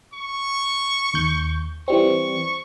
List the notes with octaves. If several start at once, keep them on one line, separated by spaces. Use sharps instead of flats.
C#6
D#2 G6
E3 G3 C4 C#6